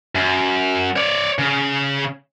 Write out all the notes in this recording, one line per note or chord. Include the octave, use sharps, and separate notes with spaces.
F#2
C#5 D5
C#3